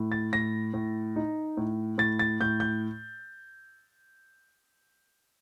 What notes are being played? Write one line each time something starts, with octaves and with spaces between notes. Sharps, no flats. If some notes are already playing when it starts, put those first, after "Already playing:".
Already playing: A2
A6
A2 A#6
A2
D#4
A2
A2 A6
A6
A2 G6
G6